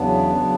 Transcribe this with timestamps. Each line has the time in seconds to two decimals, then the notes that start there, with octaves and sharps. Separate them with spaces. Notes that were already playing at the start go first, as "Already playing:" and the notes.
Already playing: E2 C#3 F#3 B3 D4
0.36 C#3 F#3